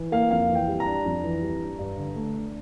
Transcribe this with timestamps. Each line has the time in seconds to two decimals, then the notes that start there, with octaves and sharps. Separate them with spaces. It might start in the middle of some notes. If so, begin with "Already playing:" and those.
Already playing: E3
0.12 A#3 F5
0.31 F2 F5
0.49 E3
0.55 G5
0.68 G3
0.80 A#5
0.85 D4
1.05 F2
1.23 E3
1.42 G3
1.61 D4
1.79 G2
1.97 D3
2.16 A3
2.34 D4